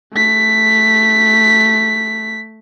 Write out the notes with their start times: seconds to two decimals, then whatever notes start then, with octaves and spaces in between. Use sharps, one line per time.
0.13 A3 B6